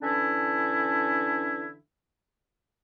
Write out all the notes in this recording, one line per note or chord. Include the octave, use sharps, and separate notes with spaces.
D3 E3 C#4 D4 E4